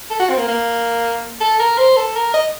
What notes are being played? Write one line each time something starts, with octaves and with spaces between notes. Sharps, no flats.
A4
F#4
C4
A#3
A#3
A4
A#4
C5
A4
A#4
D#5